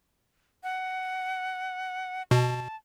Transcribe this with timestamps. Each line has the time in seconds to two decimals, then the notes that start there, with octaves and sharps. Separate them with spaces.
0.63 F#5
2.31 B2 A5